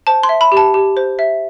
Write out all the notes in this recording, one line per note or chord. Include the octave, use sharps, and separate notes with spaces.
C5 A5
C6
E5
B5
G4
A5
G4
C5
E5